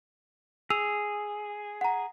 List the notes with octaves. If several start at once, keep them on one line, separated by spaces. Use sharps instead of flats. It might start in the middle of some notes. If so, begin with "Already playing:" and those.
G#4 E6 F7
F#5 A#5